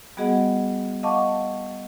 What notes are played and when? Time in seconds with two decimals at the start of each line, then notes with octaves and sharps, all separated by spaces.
0.17 G3 B3 F#4 G#4 D#5 F#5
1.03 D#5 F5 F#5 A5 C#6 D6